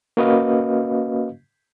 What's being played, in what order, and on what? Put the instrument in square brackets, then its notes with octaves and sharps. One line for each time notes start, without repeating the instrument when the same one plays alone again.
[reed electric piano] A#3 C#4 F#4 B4 D#5 F5